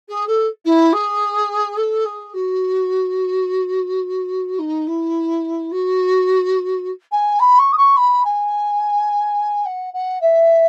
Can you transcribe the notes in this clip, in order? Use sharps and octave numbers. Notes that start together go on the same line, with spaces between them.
G#4
A4
E4
G#4
A4
G#4
F#4
D#4
E4
F#4
G#5
B5
C#6
D#6
C#6
B5
G#5
F#5
F#5
E5